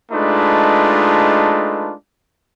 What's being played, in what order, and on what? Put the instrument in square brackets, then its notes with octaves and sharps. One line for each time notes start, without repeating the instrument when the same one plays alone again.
[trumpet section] G#3 A3 D4 D#4 F4 B4